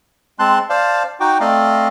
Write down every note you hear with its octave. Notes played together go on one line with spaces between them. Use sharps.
G#3 C4 A5 C6 F#6
C5 D5 F5 A5
D#4 F#4 G5 D6
A3 C4 D5 D#5 F5